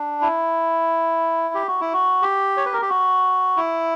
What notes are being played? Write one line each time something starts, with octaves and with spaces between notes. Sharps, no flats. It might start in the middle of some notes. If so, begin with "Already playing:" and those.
Already playing: D4
E4
G4
F#4
E4
F#4
G4
C#5
B4
A#4
G4
F#4
E4